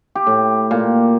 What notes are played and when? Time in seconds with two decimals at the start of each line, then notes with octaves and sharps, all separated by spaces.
0.15 G4
0.27 A2
0.71 A#2